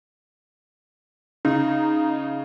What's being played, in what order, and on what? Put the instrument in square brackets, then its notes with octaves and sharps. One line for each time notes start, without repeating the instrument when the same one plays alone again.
[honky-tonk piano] C#3 [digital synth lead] D#4